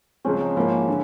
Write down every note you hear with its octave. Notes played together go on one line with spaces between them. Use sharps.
C#2 C#3 F3 G#3 C4 C#4
D#4
G#2 F3 A#3 E4
D3